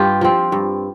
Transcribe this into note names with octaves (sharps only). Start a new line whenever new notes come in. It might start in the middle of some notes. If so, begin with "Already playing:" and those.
Already playing: G2 F4 G4
F3 C4
G2